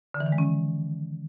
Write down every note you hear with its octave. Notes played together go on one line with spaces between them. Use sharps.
D3
E3
D#3
G#3
C#4